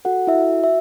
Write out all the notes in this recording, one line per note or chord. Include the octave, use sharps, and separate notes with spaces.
F#4 A4 F#5
E4 E5
F#4
E5